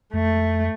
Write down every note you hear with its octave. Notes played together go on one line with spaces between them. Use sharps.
F2 A3